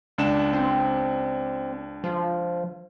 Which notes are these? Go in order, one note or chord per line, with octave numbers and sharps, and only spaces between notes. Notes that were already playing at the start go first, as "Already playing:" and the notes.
C#2 D4 E7
C4
F3